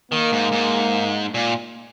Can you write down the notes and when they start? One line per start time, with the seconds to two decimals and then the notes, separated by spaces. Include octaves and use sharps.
0.12 D#3 A#3
0.32 G#2
0.52 G#2
1.34 A#2